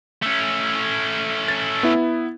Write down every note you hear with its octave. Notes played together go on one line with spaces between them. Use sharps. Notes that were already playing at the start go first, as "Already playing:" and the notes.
A3 C#4
A6
B3 E4